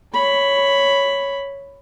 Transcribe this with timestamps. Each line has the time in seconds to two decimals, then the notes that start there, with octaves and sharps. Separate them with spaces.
0.13 C#5 B5